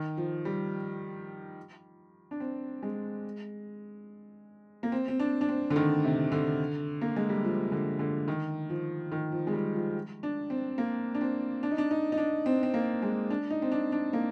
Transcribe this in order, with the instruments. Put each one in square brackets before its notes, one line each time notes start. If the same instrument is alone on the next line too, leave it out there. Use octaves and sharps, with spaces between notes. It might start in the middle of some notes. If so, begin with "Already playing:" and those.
Already playing: [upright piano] D#3
F3
G3
D4
C4
G#3
A#3
C4
C4
D4
D4
C4
D3
D#3
C3
D3
A#3
G#3
G3
F3
D3
D3
D#3
F3
D#3
F3
G#3
G3
F3
D4
C4
A#3
D4
C4
D4
D#4
D4
D#4
D#4
D4
C4
C4
A#3
G#3
D4
D#4
C4
D4
D4
A#3